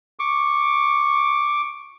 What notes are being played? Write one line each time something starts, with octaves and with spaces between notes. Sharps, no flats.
C#6 D6